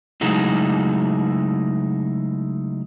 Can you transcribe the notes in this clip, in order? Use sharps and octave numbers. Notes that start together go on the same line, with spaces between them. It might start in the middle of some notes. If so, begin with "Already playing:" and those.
C#3 F#3 G#3 A3 D#4 E4